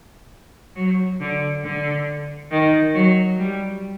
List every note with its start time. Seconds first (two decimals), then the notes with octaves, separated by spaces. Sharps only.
0.76 F#3
1.20 D3
1.64 D3
2.51 D#3
2.94 F#3
3.39 G3